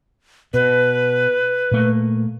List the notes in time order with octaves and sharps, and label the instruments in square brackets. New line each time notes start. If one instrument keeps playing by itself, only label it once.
[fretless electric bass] B2 [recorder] B4
[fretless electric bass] A#2 A3 A#3